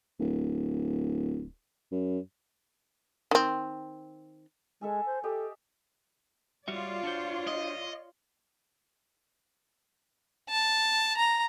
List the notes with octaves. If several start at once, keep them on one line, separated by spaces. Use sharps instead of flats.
D1
F#2
D#3 C4
G#3 A4 E5 G#5
C5
G4 A4 D#5 E5
G3 F4 F#4 C#5 D5 E5
D4 F#4 C5
D#5
A5
A#5